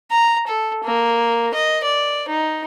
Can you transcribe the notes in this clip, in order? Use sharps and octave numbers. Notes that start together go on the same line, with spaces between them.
A#5
A4
A#3
D#5
D5
D#4